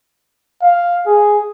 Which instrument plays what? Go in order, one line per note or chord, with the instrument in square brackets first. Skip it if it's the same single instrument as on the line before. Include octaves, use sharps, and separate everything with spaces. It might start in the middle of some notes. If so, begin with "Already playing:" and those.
[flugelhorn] F5
G#4